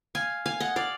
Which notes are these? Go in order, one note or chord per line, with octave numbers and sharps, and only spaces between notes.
F5 G#5
F5 G#5
D#5 F#5
D5 F5